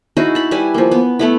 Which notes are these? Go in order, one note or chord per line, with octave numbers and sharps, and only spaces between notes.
D#4 E4 F#4 G#4
A5 B5
G3 E4 B4 G#5
F3 A#3
B3
A3 B3 E4